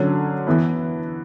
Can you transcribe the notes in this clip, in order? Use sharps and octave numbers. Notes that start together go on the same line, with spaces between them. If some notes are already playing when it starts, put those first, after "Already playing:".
Already playing: D3 F#3 C#4
E3 B3 E4